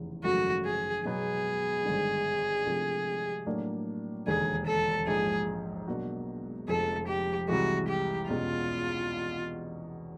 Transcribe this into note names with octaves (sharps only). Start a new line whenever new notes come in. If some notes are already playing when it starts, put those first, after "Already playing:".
Already playing: F1 E2 C#3 E3
G#1 F#2 C#3 F3 A3 F#4
G#4
B2 F#3 B3 G#4
G#1 G2 D3
C3 F3 A3 D4 F4
A2 F#3 A#3 D4
E1 D#2 D3 G#4
A4
A#1 G#2 F3 G#4
B2 F#3 A#3 D4 F#4
F1 F2 D3 F3 G#3 A4
G4
C2 C3 E3 G#3 F#4
G4
E2 B2 G#3 C#4 F4